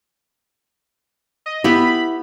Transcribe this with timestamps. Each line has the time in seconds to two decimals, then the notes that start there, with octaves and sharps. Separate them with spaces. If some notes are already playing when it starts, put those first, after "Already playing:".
1.46 D#5
1.64 B3 E4 G4 B5